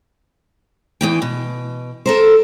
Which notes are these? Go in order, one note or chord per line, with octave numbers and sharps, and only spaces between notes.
E2 E3 G5
B2
A4 A#4 C5